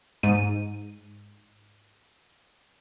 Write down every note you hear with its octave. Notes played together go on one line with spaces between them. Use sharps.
G#2 D#7